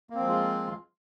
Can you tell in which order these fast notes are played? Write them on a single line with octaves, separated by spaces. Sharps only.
A#3 C4 F3 G#3 F4